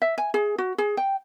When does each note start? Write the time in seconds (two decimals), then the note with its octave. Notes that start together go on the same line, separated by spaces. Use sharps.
0.02 E5
0.18 G#5
0.34 G#4
0.58 F#4
0.78 G#4
0.97 G5